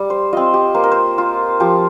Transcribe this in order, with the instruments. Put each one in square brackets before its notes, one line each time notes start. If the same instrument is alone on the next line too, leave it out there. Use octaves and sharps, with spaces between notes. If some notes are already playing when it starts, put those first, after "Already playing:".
Already playing: [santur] G3
C5
C4 F4 D#5
G4
A#3 C5
A#4
C5
F4
F3 G4